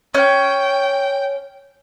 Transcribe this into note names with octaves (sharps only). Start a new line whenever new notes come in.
C#4 G5